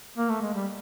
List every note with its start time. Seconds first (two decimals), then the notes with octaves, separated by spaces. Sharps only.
0.18 A#3
0.29 A3
0.42 G#3
0.54 G3